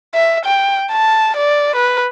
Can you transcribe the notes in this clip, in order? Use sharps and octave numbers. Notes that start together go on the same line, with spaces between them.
E5
G5
A5
D5
B4